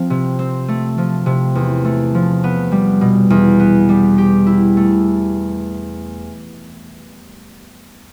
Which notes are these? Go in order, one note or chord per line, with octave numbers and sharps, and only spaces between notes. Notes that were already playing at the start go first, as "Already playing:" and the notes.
Already playing: F3 C4
C3
C4
A3
F3
C3
E2
A3
F3
B3
G3
B2
E2
B3
G3
G4
E4
A3